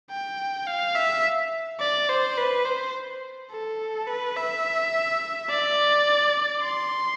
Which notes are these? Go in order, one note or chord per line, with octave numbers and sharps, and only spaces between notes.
G5
F5
E5
D5
C5
B4
C5
A4
B4
E5
D5
C6